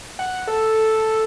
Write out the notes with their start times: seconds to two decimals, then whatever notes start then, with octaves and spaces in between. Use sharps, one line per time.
0.19 F#5
0.47 A4